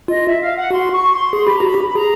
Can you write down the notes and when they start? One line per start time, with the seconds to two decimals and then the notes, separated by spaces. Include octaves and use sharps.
0.08 F4 D#5
0.24 E5
0.40 F5
0.55 F#5
0.71 F#4 C6
0.92 C#6
1.12 C6
1.33 G#4 C6
1.44 G4 B5
1.56 F#4 A#5
1.66 B5
1.74 G4
1.86 B5
1.95 G#4 A#5